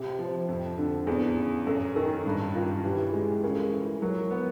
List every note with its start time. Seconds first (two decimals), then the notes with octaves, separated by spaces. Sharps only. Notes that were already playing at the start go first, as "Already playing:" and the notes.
Already playing: C3 G4
0.19 F3
0.49 F2
0.78 D3
1.07 E2 G#4
1.37 C#3
1.67 F#2 A4
1.96 D#3 A4
2.26 G2
2.55 D#3 F4
2.84 E3 G4
3.13 G#3
3.44 C#3 A#4
3.52 A4
3.62 G#4
3.72 E3 A4
4.02 F#3 A#4
4.31 B3